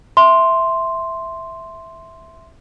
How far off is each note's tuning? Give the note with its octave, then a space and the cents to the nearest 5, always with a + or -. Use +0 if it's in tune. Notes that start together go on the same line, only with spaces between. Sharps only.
E5 +0 C6 +0